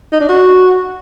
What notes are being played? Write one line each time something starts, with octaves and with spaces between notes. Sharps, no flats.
D#4
D4
F#4